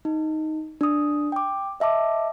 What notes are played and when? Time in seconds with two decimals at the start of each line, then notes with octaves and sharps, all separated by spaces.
0.05 D#4
0.81 D4 D#6
1.32 G5 D6
1.80 D#5 E5 A5 D6